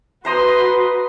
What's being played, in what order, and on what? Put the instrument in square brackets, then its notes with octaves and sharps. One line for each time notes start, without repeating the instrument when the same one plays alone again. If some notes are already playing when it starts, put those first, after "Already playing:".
[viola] F#4 B4 [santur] C5 A#5 D#6 [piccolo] C6